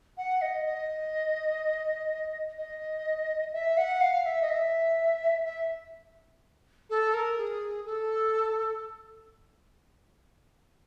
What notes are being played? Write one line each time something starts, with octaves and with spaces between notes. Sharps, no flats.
F#5
D#5
D#5
D#5
E5
F#5
F5
E5
D#5
E5
E5
A4
A#4
G#4
A4